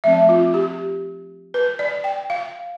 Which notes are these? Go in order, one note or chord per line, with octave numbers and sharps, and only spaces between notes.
F3 A3 C4 E5
F4
G4
B4
D5
G5
F5